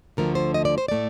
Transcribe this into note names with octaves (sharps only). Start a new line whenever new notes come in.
D2 D3 F3 A3 A#4
C5
D#5
D5
C5
A2 A3 D5